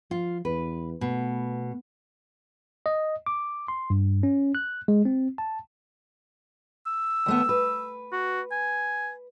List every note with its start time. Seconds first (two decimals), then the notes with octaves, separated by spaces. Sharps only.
0.11 F3 F4
0.45 E2 B4
1.01 B2 A3
2.86 D#5
3.26 D6
3.68 C6
3.90 G2
4.23 C#4
4.55 F#6
4.88 G#3
5.05 C4
5.38 A5
6.87 E6
7.26 D#2 A3 B3
7.49 B4
8.12 F#4
8.51 G#5